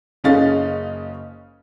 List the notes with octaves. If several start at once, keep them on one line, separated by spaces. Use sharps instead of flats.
F#1 C#3 C#4 D#4 F5 A6